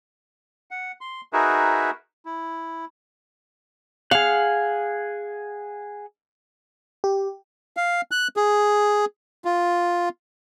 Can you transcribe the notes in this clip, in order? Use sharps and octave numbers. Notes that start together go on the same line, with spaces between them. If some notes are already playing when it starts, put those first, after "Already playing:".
F#5
C6
D#4 F#4 G#4 A#4 B4 E5
E4
G#4 F5 F#5
G4
F5
F#6
G#4
F4